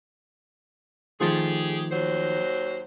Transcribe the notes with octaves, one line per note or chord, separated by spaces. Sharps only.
D#3 F3 A3 G4 G#4
D#2 F#3 C5